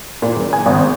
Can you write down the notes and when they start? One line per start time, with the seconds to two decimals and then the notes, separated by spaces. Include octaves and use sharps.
0.22 A#2
0.36 F#1
0.53 G#5
0.66 G#1
0.78 C4